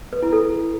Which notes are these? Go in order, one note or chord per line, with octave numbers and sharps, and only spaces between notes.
B4
E4
A4